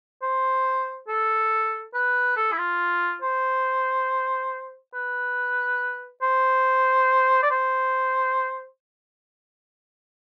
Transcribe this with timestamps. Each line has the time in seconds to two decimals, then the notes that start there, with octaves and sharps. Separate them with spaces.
0.22 C5
1.08 A4
1.94 B4
2.36 A4
2.52 E4
2.58 F4
3.22 C5
4.94 B4
6.22 C5
7.43 D5
7.51 C5